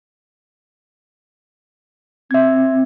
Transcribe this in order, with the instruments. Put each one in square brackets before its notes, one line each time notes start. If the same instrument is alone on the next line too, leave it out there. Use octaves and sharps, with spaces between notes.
[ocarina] C4 [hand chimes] E5 G#6